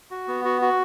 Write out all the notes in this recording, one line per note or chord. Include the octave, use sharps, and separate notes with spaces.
F#4
B3
F#4
F#4